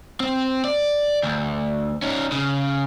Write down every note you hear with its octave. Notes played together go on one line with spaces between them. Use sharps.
C4
D5
D2
C#4 D#4
C#3